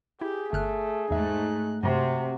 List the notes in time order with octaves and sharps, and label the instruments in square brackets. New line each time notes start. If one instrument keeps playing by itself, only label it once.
[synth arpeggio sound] E4 [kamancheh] G4 [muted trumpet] G#4
[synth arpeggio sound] G1 F6 F#6 [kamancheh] A3
[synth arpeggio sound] E2 E5 [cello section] G#2 A3 [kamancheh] D#4 F#6
[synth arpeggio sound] G2 [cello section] C3 [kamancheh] F#4